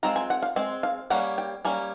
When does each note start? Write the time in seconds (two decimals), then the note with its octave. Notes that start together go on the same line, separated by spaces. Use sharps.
0.03 G#3 C4 F4 A#5
0.16 G#5
0.30 F#5
0.42 F5
0.56 G#3 C4
0.83 F5
1.10 G3 A#3 C#4 F#5
1.38 G5
1.65 G3 A#3 C#4 G#5